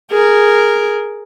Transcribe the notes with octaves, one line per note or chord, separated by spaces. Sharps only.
G#4 A#4